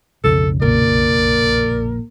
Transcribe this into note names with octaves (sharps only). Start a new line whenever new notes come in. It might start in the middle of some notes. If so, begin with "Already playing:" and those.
B1 F2 C#3 A4
A#1 A#2 A#4 D5